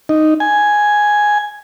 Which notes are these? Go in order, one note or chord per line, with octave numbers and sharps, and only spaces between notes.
D#4
G#5